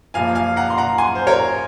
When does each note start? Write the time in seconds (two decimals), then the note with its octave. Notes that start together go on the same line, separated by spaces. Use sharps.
0.14 F#1 F#2 F3 A#3 F5 G#5
0.35 F5 G#5
0.56 F#5 A#5
0.70 C6
0.78 F#5 A#5
0.98 G#5 C6
1.15 C5
1.27 A#4 C#5